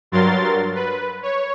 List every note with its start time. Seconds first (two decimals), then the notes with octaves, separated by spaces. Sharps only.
0.12 G2 F#3 A#4 C6 A6
0.75 B4
1.23 C#5